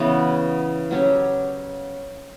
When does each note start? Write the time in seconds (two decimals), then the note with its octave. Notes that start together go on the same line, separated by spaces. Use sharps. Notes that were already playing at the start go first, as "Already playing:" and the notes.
Already playing: C#3 E3 B3 F#4
0.91 F#3 C#4 G4